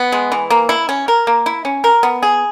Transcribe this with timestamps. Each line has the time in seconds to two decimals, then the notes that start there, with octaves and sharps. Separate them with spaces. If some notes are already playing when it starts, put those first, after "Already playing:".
Already playing: B3
0.12 G#3
0.32 E3
0.50 A#3
0.69 E4
0.89 C#4
1.08 A#4
1.27 A#3
1.46 E4
1.65 C#4
1.84 A#4
2.03 B3
2.23 G#4